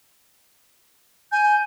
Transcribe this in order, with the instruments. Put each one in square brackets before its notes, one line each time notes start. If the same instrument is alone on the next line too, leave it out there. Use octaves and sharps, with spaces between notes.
[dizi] G#5 [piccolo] G6